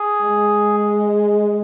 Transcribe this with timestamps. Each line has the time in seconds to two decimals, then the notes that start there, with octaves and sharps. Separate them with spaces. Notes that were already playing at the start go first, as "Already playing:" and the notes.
Already playing: G#4
0.23 G#3